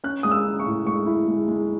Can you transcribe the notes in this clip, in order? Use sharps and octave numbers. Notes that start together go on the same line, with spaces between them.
C#4 F#6
G#3 D#6
E6
C#4
C#6
A2
G#3 C#6
E4
G#3
G#3